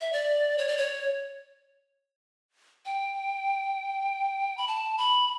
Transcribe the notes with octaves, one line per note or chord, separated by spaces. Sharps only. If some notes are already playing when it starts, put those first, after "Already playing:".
E5
D5
C#5
D5
C#5
G5
B5
A5
B5